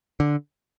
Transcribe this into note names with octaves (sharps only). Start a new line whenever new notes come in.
D3